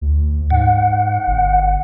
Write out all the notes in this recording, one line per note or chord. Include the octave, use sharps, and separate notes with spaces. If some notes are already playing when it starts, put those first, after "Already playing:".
D2
G#2 F#5
G1